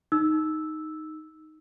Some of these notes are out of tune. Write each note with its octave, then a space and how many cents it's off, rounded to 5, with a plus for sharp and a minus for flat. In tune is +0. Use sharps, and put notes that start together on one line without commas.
D#4 +0 E6 -5